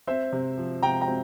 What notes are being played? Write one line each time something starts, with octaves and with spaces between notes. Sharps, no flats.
C4 C5 E5
C3
F3
C3 G5 A#5
G5 A#5
C4